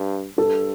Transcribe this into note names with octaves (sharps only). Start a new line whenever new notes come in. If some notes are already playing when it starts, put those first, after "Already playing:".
Already playing: G2
G2 A4